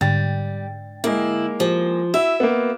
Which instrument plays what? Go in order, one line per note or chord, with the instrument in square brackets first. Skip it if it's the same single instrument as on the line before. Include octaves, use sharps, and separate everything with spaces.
[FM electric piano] G#2 D3 G5 [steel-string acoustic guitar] G3 [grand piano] A6
[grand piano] G#3 A#3 [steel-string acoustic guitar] E4
[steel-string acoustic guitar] F3 [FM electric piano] G4
[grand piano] E4 [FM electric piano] F#4 [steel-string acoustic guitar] E5
[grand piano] A#3 B3